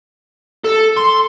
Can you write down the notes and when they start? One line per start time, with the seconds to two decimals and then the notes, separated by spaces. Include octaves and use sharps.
0.65 A4
0.97 C6